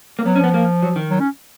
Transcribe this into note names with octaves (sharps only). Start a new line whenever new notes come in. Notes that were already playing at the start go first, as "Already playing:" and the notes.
A#3
F#3 B3
C#4
F3 B3
A#3
F#3
D#3
F#3
C#4